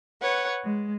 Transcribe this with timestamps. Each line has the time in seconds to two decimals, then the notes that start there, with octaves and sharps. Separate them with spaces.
0.21 B4 C#5 F#5
0.63 G#3